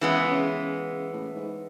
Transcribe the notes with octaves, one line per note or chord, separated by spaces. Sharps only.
C#3 E3 G#3 B3
C#3
C#3
A2
G#2